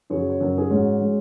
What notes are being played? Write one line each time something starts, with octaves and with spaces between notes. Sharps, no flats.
F#2 C#3 F#3 G#4 C#5
C#5
F#2 C#3 F#3 A#4
G#4
G#2 G#3 C#4 F#4
G#3